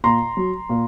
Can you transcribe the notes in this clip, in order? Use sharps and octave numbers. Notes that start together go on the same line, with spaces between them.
A#2 A#5 C6
F#3
A#2